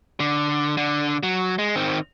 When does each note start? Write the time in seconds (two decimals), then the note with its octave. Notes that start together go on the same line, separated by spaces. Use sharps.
0.20 D3
0.77 D3
1.23 F#3
1.59 G#3
1.75 D#3 C4